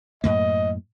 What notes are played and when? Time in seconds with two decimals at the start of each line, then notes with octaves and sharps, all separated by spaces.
0.24 F#2 A2 A#3 D#5